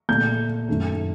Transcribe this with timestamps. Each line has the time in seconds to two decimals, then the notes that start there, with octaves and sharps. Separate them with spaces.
0.09 A#2 A3 G6
0.69 F#2 D#3 A3